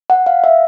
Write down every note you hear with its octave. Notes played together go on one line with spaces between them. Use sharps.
F#5
F5
E5